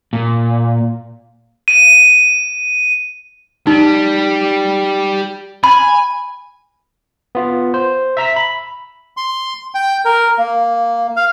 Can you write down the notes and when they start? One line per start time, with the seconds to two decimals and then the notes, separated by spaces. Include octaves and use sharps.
0.13 A#2
1.68 D#7
3.67 G3 D#4
5.64 G#5 B5
7.35 B3 F4
7.74 C5
8.17 E5 A#5 E6 B6
8.36 B5
9.17 C6
9.75 G5
10.05 A#4
10.38 A#3
11.16 F5